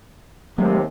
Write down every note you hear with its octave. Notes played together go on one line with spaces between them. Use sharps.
D#2 C3 F#3 G#3 A3